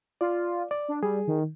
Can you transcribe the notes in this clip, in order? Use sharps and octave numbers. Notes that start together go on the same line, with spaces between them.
F4 D5
D5
D4
G3 G#4
D#3